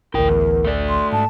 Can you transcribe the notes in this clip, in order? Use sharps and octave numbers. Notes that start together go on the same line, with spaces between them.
A1 D2 E4 A#4 G5
E2
A3 D5
C6
G#2 A5